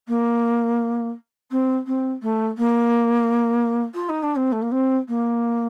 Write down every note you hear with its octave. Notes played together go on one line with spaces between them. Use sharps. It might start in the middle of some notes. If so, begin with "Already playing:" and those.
A#3
C4
C4
A3
A#3
F4
D#4
D4
C4
A3
A#3
C4
A#3